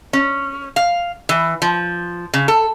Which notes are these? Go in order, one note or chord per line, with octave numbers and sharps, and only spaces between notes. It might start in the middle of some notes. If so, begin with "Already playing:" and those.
C#4
F5
E3
F3
C#3
A4